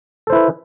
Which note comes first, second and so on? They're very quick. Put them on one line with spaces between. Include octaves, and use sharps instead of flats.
A4 C5 E4 B4